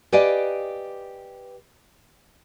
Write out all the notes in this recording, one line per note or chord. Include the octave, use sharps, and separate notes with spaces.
G4 B4 D5 D#5 F5 G#5